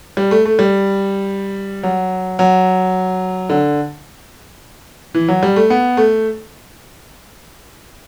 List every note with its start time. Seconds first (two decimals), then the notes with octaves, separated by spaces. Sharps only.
0.17 G3
0.31 A3
0.45 A3
0.59 G3
1.83 F#3
2.39 F#3
3.49 D3
5.14 E3
5.28 F#3
5.43 G3
5.56 A3
5.70 B3
5.97 A3